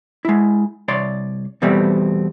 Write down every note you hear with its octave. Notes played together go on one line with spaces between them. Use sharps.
G#3 E4
C2 C#5 D5 C6
E2 B2 G3 A3 B3 C4